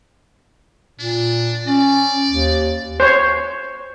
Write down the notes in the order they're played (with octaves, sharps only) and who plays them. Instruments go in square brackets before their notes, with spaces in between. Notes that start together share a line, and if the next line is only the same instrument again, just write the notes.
[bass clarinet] A#2 [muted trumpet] D4
[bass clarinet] C#4 [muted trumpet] D5
[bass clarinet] D#2
[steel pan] C5 C#5